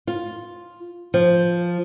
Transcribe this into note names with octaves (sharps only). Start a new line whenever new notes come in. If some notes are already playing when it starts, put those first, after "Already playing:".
F4
F3